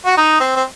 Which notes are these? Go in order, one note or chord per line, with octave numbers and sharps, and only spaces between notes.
F#4
D#4
C4
C4